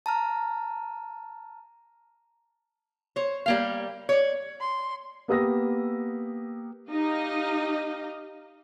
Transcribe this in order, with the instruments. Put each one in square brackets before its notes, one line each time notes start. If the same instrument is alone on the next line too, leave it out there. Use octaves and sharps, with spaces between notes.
[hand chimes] A5 A#5 F6
[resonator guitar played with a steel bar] C5 C#5
G3 A#3 F5
C#5 D5
[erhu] C6
[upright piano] A#3 B3 G4 D#6 E6 A#6
[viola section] D#4 G4 D#5 F5